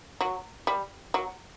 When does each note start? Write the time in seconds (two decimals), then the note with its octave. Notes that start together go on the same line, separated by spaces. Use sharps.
0.21 F#3
0.67 G3
1.14 F#3